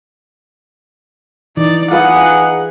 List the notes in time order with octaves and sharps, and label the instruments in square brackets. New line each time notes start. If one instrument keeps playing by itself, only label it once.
[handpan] E3 [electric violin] D#4 D5
[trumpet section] D#4 G#4 [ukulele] F4 B4 F5 [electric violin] F#5